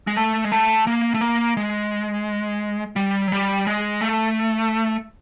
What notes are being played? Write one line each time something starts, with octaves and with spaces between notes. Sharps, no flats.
G#3
A3
G#3
A3
A#3
A3
A#3
G#3
G3
F#3
G3
G#3
A3